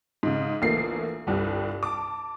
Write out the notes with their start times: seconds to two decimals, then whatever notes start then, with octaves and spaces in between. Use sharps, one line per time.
0.23 G#2 C#3
0.62 A#1 E2 A3 A#3 C7
1.27 G1 C2 G3
1.83 A5 D6